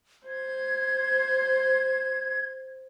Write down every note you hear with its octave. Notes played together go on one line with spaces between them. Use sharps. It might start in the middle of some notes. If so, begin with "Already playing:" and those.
C5 G#6